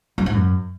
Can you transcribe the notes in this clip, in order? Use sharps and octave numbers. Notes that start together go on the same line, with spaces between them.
F#2
G#2
F#2